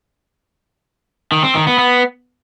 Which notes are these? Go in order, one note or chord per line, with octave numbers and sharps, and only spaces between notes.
D#3
C4
D#3
B3
B3